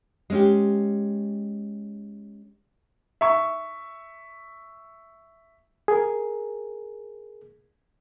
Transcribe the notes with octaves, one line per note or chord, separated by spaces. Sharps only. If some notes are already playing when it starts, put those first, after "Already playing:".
G#3 C#4 G4
E5 C#6
G#4 A#4